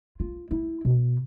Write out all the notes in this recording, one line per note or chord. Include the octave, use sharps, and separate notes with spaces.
F4
E4
B2